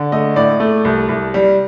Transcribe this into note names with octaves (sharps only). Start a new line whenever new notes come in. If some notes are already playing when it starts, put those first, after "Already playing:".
Already playing: D3
A3 D#5
A2 D5
A3
C2
C2
G3